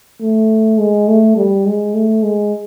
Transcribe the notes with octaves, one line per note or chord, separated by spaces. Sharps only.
A3
G#3
A3
G3
G#3
A3
G#3